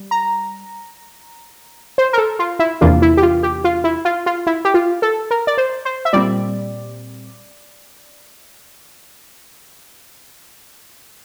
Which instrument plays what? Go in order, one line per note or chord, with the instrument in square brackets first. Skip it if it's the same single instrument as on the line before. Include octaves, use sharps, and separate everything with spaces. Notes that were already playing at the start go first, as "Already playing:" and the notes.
Already playing: [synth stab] G3
A#5
C5
A#4
A4
F4
E4
E2 C3 E3 A#3 D4 F4
E4
G4
F4
G4
F4
E4
F4
F4
E4
G4
F4
A4
A#4
D5
C5
C5
E5
A#2 G3 C4 D5